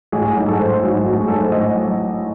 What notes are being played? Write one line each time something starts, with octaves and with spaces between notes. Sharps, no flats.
A1 G#4
G#4
G#2 F#3 G#4
A4
A1 C5
G#2 F#3 F#4
A1 F#4
G#4
G#2 F#3 A4
C5
A1 D#5
F#3